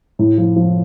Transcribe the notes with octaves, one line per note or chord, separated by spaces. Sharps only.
A2
F3
F3